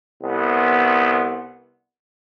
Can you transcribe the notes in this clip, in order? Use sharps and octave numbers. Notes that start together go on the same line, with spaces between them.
C2 B3